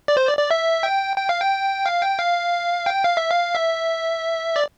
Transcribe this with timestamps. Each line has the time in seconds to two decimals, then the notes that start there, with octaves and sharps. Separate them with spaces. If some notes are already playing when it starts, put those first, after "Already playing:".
0.08 D5
0.17 C5
0.27 D5
0.38 D5
0.51 E5
0.83 G5
1.17 G5
1.29 F5
1.41 G5
1.86 F5
2.02 G5
2.19 F5
2.86 G5
3.04 F5
3.17 E5
3.31 F5
3.55 E5
4.56 D5